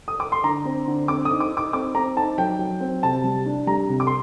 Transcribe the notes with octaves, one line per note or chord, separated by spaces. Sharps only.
D#6
D6
C6
D3 A#5
C4
D3
C4 D6
D#6
D#4
D6
D#4
D6
C4 D6
C4 A#5
D#4 A5
F#3 G5
F#3
C4
C3 A5
G3
D4
G3 A#5
C3
D6
C6